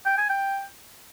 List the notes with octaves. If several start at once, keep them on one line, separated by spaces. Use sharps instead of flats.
G5
G#5
G5